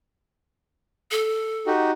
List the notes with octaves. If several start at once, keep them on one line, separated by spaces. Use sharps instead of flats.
A4
D#4 F#4 G4